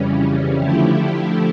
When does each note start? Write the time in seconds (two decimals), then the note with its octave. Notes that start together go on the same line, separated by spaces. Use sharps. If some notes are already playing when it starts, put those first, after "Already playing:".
Already playing: F2 C#3 E3 G3 C#4
0.60 D3 F3 A3 E4 G4